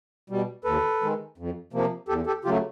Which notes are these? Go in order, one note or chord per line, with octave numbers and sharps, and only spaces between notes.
B2 G3
D#2 A4 B4
D#3 G#3
F2
C3 F3 A#3
E2 G4 A4
G4 A4
C#3 F#3 A3 F4 G4